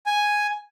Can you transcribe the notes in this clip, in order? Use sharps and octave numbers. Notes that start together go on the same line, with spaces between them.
G#5